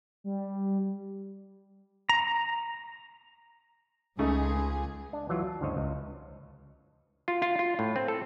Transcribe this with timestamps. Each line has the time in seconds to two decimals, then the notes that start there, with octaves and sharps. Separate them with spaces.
0.24 G3
2.09 A#5
4.19 C#2 C#3 A3 D#4 G#4
5.13 D4
5.29 E3 F#3 F4
5.48 A5
5.61 D2 G2 C#3 C5 C#5 D#5
5.77 C#2
7.28 F4
7.42 F4
7.59 F4
7.79 A2
7.96 C4
8.08 A4